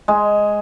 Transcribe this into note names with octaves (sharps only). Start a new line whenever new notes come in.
G#3